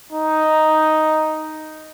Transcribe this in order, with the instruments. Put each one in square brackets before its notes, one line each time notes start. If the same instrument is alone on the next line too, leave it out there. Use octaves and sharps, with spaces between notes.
[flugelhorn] D#4